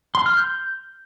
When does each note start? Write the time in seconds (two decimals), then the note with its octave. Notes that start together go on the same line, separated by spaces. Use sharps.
0.15 C6
0.26 F6
0.37 G6